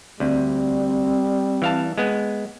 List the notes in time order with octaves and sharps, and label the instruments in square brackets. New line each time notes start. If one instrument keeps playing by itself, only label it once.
[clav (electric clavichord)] D2 [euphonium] G3 [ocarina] C4
[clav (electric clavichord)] E3 F5 A5
G#3 B3